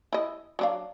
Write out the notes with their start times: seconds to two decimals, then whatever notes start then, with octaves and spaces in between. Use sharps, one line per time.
0.13 E4 D#5
0.59 F#3 D4 F5